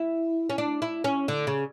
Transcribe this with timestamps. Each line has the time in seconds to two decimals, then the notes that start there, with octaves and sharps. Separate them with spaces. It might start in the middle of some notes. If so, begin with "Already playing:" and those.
Already playing: E4
0.50 C#4
0.58 D4
0.82 E4
1.04 C#4
1.28 D3
1.47 C#3